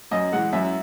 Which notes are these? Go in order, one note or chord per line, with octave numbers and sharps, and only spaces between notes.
F#2 D#5
E3 G#3 F#5
F#2 E5